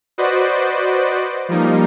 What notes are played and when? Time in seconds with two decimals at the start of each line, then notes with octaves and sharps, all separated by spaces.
0.18 F#4 B4 C5 D5 D#5
1.49 F3 G3 A#3 D#4